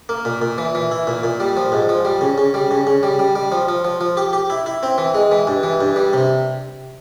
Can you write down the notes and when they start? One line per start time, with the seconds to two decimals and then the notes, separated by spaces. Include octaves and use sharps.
0.09 A#3
0.25 A#2
0.42 A#2
0.58 E3
0.75 E3
0.91 E4
1.07 A#2
1.23 A#2
1.40 G3
1.57 F3
1.72 G#2
1.89 F3
2.05 G3
2.21 C#3
2.38 C#3
2.54 G3
2.71 C#3
2.87 C#3
3.03 G3
3.19 G3
3.36 G3
3.52 F3
3.69 F3
3.85 F3
4.01 F3
4.17 G4
4.33 G4
4.50 E4
4.66 E4
4.83 C4
4.98 E3
5.14 G#3
5.31 E3
5.47 G2
5.63 E3
5.81 G2
5.96 G3
6.13 C3